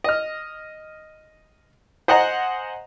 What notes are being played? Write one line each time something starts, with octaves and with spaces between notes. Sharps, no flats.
D#5 F6
C5 D#5 F#5 G#5 A#5